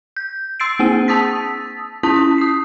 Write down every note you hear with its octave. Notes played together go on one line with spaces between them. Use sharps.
G6
C6 E6 A6 C7 D7
A#3 C4 G#4 D#7
A5 D#6 E6 A6 B6
C#4 E4 A5 D#6 B6
D#6 C7